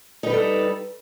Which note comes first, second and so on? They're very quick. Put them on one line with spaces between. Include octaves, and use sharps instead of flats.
D#4 B4 G3 A4